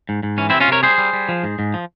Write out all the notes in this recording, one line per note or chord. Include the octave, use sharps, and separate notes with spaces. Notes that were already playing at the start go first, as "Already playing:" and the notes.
G#2
G#2
E3 C#4
C4 E4
C3
C#4 F4
C3 A#4 C#5
G3 G#4 C5
G3
G3
F3
G#2
G#2
F3